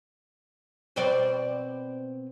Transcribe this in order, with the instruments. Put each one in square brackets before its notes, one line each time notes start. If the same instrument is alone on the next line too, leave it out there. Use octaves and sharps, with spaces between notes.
[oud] B2 C4 D5